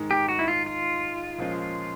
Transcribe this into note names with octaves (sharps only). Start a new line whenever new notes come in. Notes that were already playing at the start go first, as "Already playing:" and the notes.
Already playing: G#2 D#3 G#3
G4
F#4
E4
F4
F4
A#2 F3 G#3 C#4